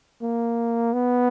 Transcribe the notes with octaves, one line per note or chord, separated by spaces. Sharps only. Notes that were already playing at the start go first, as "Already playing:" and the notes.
A#3
B3